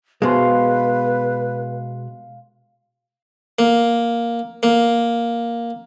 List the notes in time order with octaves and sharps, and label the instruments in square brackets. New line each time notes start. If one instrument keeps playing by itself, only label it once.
[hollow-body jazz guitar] B2 G#3 [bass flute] B4 [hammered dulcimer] F5 C6
[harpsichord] A#3
A#3